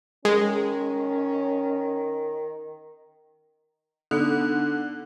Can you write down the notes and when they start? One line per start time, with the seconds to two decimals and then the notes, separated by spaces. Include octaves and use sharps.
0.25 D#3 G#3 C#4
4.11 D3 B3 D#4